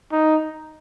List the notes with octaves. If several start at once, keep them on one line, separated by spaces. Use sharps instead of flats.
D#4